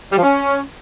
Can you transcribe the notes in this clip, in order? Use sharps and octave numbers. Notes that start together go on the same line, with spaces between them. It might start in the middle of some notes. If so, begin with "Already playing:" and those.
G3
F3
C#4